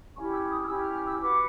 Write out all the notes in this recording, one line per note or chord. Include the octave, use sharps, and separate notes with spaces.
C#4 E4 G4 C#6
E6
D#6
F6
C#4 E4 G4 E6
F6
F6
E6
F#4 B4 D6